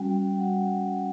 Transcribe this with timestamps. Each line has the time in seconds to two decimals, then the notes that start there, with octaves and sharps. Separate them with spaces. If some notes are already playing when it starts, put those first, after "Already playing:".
Already playing: G3 C#4 F#4 G5
0.38 G3 C#4 F#4 F#5